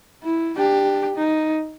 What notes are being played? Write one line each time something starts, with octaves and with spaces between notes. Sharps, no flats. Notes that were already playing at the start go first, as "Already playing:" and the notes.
E4
D4 G4
D#4